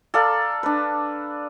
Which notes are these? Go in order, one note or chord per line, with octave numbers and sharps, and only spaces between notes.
A4 D5 F5 A#5
D4 B4